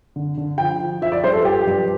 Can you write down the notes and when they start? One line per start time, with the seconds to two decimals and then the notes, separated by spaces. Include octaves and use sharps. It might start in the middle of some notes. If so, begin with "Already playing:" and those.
0.16 D3
0.37 D3
0.58 F3 G5
0.80 F3
1.02 F3 E5
1.12 D5
1.24 G2 C5
1.33 A4
1.44 F3 G4
1.67 G2